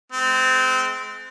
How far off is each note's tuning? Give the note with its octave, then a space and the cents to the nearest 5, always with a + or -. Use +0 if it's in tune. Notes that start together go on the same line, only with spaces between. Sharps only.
G#3 +30 C4 -20